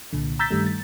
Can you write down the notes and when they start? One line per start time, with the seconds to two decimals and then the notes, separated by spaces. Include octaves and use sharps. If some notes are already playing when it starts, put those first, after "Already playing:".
0.13 C2 A#2 D3
0.39 A#5 E6 G6 A6 B6
0.51 G2 D#3 G3 A3
0.67 A6